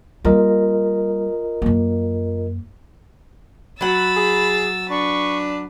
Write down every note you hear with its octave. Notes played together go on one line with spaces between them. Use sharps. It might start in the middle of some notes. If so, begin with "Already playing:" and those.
G3 A#3 F4 A#4 D#5
F#2 A#3
F#3 F#5 B5 E6 A6
G#4
D4 B4 C#6